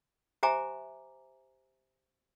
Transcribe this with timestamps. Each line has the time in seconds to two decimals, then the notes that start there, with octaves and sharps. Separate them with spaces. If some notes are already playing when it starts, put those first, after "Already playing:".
0.43 G4 C5 E5 G#5 A#5 D6